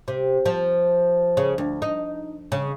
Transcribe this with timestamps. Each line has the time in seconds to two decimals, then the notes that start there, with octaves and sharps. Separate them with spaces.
0.08 C3
0.46 F3
1.37 C#3
1.58 D2
1.82 D#4
2.52 C#3